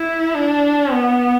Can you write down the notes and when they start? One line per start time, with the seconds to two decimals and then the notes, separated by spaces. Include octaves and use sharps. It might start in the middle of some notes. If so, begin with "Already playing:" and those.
Already playing: E4
0.35 D4
0.92 B3